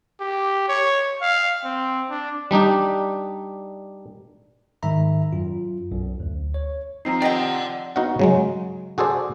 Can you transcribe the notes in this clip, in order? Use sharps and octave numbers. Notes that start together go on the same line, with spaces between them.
G4
C#5
F5
C4
D4
G3 D4 D#4 G4
G#2 D#3 E5 A#5 B5
F#2 F4
B1 F#2
D2
C#5
F3 C4 D#4 A#5 C7
G4 D5 D#5 F#5 G5
B3 D#4 F#4 D#5 F5 F#5
C#3 F#3 G#3
F#4 G#4 A4 C5 D5